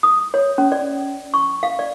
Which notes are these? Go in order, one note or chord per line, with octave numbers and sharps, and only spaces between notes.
D#6
C#5
C#4
D5
C#6
F5
D5